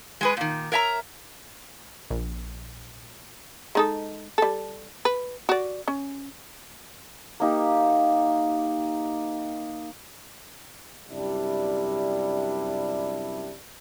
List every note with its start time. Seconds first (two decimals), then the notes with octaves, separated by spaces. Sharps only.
0.21 G#3 G#4 B4
0.37 A#2 D#3
0.72 A#4 C#5 E5 A5 A#5
2.11 A#1
3.75 G#3 D#4 A4
4.38 G3 A4
5.05 B4
5.49 F#4 D5
5.88 C#4
7.40 A#3 D#4 G4
11.09 F#2 C3 G3 D4 E4